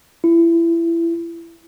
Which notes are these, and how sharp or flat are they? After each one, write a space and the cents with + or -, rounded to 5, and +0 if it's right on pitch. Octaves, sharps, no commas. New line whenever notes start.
E4 +25